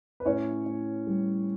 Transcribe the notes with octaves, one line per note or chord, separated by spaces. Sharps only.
B4
A2 C#4 C#5
A2
G3